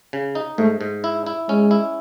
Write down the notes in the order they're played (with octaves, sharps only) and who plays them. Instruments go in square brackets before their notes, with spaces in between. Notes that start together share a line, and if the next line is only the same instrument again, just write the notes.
[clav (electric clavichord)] C#3
D#4
[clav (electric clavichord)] G#2 [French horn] A3
[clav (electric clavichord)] G#2
E4
E4
[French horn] G#3 [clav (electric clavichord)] C#4
[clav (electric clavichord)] E4